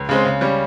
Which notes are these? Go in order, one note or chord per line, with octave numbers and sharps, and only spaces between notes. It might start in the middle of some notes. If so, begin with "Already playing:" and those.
Already playing: C#2
C#3 G#3 C4
C#3
G3 C#4